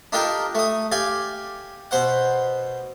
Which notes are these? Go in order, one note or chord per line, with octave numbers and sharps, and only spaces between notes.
D4 D#4 F4 G4 A4 A#4
A3 D#6
G4 D5 F5 G#5
B2 C5 F#5